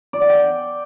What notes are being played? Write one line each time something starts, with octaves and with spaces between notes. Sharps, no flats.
D5
F#5
G5